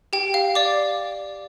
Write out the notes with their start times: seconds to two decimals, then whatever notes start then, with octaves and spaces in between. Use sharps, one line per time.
0.13 G4 G5
0.34 F5
0.55 D5 D6